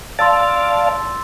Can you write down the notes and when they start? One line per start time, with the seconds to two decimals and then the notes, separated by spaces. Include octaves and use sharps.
0.19 D5 F5 A5 C6 E6 A6